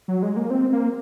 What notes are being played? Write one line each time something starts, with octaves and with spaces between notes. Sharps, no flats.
F#3
G#3
A#3
C4
A#3